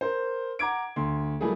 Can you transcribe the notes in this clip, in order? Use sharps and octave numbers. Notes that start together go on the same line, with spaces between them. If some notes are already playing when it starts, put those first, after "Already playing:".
A#4 C5
F#5 A#5 D6 G#6 D7
D2 C6
F#3 G3 A3 A#3 E4 G#4